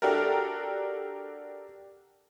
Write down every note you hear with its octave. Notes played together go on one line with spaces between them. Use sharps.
D4 F#4 G4 A4 A#4